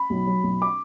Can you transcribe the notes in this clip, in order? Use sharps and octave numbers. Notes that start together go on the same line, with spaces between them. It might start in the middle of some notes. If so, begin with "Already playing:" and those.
Already playing: B5
B1
F#3
B1
D6